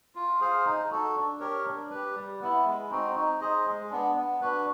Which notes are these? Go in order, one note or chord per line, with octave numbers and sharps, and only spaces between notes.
F4
G#4 C5 F5
D#4
F#4 A4
D4
G4 A#4 C#5
D4
G4 B4
G3
B3 E4
G#3
C4 D#4 F#4
D#4
G#4 C5 D#5
G#3
B3 D4
B3
D4 F#4 B4